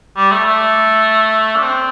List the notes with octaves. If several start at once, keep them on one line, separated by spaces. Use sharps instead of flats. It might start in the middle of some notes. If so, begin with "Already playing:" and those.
G3
A3
A3
D4
C4